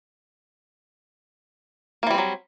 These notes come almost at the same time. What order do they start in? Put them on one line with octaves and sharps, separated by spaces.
A#3 E3 G3 C4 F#3